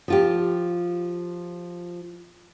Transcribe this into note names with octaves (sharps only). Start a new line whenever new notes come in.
F3 F4 G4